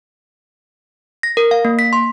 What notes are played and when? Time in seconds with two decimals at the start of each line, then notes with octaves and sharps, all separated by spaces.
1.23 A#6
1.37 A#4
1.51 F5
1.65 A#3
1.79 B6
1.93 C6